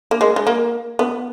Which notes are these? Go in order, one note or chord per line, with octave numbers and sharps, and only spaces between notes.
A#3
G#3
G#3
A#3
B3